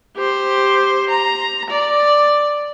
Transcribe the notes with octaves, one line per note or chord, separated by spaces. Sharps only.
G4 C5
A#5
D5